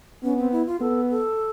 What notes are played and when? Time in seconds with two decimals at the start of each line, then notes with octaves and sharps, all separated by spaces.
0.23 B3 C#4
0.38 C4
0.52 E4
0.66 F4
0.81 B3 A4
1.10 A4